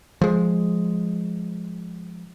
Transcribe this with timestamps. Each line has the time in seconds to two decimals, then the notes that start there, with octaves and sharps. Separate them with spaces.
0.21 F3 G#3